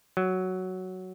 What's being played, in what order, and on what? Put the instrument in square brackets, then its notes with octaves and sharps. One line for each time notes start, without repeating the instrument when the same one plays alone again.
[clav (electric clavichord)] F#3